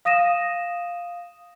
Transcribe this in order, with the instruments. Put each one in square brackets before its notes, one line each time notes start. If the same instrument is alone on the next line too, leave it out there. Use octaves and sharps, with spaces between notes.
[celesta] F5 D#6 A#6 D#7 E7